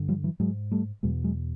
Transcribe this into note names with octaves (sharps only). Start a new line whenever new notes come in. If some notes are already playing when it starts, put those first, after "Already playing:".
Already playing: G2 D3
F3 G3
E3 F#3
G#2 F#3 G#3
G3 A3
E2 B2 F#3 G#3
F#3 G#3